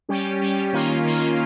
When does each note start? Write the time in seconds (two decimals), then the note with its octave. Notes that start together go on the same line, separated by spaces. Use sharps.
0.09 G3 C#4 G4
0.41 G3 C#4 G4
0.73 D#3 A#3 C#4 F4
1.05 D#3 A#3 C#4 F4